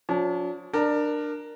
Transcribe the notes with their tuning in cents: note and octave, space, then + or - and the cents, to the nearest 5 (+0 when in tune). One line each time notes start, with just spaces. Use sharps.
F3 +40 D4 -45
D4 +20 A#4 +0